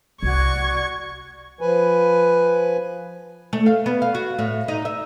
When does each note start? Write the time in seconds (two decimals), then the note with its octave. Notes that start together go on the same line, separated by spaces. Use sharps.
0.23 C2 F#4 D5 C#6 G#6
1.61 F3 B4 G#5
3.53 A3
3.66 F5
3.86 B3
4.02 F5
4.15 F#4
4.39 A2
4.68 D#4
4.85 E5